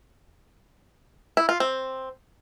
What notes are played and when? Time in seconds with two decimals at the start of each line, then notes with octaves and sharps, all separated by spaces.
1.37 E4
1.49 F4
1.60 C4